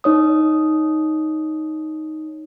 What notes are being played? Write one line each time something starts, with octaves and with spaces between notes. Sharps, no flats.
D#4 C#5 D#6